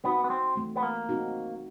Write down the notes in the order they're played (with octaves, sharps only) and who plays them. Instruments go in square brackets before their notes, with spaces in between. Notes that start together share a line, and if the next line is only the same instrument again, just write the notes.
[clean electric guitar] B3 [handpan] C4 D#4 F#4
[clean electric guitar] B3
C4
[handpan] E3 A3 C4
[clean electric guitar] B3
A#3
[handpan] C4 D#4 F#4